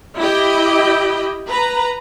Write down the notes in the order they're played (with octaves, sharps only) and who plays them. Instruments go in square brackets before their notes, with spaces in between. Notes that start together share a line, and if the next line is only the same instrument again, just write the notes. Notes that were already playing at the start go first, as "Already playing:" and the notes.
[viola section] E4 G4 D#5 G5
B4 A#5